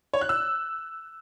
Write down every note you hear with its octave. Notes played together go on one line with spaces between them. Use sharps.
C#5
F#6
E6